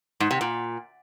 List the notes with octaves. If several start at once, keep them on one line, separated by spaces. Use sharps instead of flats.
G#2
C3
A#2